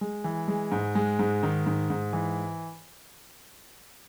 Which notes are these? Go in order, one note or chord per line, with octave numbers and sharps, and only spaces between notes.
G#3
E3
G#3
G#2
G#3
G#2
D#3
G#2
G#2
E3